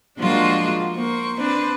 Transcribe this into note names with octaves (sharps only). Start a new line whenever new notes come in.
F3 G#3 A#3 D4 F4 F#4
A#3 C5 C#6
C4 D4 B4 C5